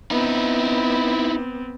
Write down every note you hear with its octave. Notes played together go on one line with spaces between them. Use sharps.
B3 C4 D#4 E4